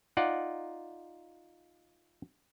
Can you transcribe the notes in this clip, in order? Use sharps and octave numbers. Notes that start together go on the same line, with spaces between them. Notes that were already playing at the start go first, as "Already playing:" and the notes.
D#4 F4 D5 F#5